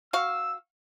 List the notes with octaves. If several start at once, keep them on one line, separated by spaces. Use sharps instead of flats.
F#4 F5 E6